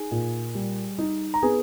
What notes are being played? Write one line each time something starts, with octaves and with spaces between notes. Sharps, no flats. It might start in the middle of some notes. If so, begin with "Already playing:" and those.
Already playing: D#4 G#4 G#5
A#2
G3
D#4
A#5
B3 G#4 G#5